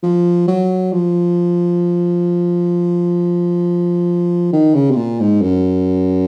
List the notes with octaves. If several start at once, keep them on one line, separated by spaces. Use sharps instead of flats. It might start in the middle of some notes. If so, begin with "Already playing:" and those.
F3
F#3
F3
D#3
C#3
C3
A#2
G#2
F#2